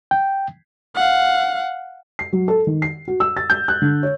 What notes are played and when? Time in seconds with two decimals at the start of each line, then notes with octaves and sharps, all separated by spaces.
0.11 G5
0.95 F5 F#5
2.19 C7
2.33 F#3
2.48 A4
2.67 D#3
2.82 C7
3.08 F#4
3.20 E6
3.37 A6
3.50 G6
3.68 F#6
3.82 D3
4.03 C#5